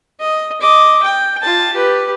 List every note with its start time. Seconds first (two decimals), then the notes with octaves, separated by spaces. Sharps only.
0.20 D#5
0.61 D#5 D6
1.03 G5
1.42 F4 A5
1.73 G4 B4